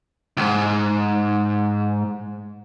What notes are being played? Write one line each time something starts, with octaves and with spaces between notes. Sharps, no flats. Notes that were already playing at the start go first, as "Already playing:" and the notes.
C#2 G#2